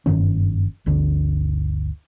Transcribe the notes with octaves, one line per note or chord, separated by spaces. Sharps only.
F#1 G2 D#3 C#4
G1 D2 D3